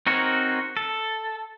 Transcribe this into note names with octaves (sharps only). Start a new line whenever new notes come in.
C4 D#4 F#4 A#4 C#5
A4